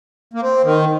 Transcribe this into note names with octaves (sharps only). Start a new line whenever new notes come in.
A#3
C4
D#3